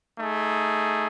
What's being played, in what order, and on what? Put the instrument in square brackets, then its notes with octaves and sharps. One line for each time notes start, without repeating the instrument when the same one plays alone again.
[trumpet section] A3 D#4 G#4